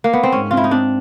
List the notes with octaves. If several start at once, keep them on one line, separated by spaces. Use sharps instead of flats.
A#3
B3
C4
G#2 C#4
C4 F4
E4
D#4
C4 D4